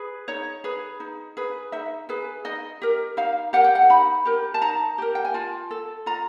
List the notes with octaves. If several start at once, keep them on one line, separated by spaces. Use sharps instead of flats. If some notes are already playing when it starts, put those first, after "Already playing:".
Already playing: G#4 B4
D#4 C#5
G#4 B4
D#4
G#4 B4
D#4 E5
G#4 B4
D#4 D#5
G4 A#4
D#4 F5
G4 A#4 F#5
G5
F#5
D#4 B5
G4 A#4
A5
D#4 A#5
G4 A#4
G5
G#5
F4 A5
A4
F4 A#5